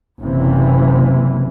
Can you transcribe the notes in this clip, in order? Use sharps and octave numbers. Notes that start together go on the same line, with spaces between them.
F#1 C3 E3